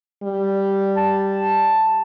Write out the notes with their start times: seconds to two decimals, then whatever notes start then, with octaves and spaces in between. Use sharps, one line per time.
0.23 G3
0.97 A5